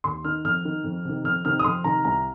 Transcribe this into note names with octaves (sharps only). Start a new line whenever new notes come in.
D#2 C6
D#3 F6
F2 F6
D#3
F2
C3 D#3
F2 F6
C3 D#3 F6
D#6
F2 C6
C3 D#3 A#5
C2 A#5